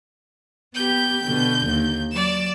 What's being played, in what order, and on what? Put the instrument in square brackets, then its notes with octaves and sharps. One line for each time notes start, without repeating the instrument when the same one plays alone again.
[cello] B3 G4 [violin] G6
[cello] B2 D3
D#2
[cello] F#3 [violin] D5 E7